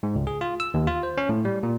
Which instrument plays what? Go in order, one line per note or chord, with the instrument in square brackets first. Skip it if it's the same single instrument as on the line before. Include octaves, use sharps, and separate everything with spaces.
[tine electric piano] G#2
C#2
G#4
F4
E6
D#2
F4
C5
C#4
A2
G3
A#2